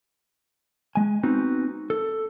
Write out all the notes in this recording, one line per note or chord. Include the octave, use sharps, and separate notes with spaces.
G#3 G#5
B3 C4 D#4 F#4
A4